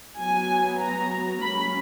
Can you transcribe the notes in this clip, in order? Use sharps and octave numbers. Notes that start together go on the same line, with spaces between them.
F#3 B3 G#5
A#5
F#3 A#3 C#4 B5